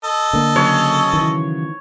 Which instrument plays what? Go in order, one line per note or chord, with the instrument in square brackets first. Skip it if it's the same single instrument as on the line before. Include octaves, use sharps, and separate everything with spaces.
[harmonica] A4 D#5
[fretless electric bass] D3 A#3
[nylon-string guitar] C#3 F#3 [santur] C#5
[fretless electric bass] D#3 E3